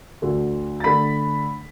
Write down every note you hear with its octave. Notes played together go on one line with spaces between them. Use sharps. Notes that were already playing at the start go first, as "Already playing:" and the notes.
D2 D3 A3
A6
D3 A3 B5 B6